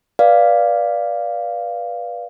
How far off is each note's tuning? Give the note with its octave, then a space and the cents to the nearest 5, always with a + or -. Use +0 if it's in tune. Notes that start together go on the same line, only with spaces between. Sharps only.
B4 -20 D5 +0 F5 +0